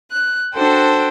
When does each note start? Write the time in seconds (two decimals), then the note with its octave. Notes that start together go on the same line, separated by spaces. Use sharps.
0.11 F#6
0.54 D4 F#4 A4 C5 G5